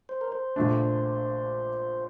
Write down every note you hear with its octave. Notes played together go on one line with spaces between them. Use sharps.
C5
A#4
C5
A#1 A#2 A3 D4